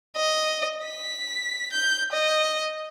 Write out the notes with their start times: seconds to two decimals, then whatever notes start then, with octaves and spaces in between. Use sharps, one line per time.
0.17 D#5
0.85 B6
1.73 G6
2.12 D#5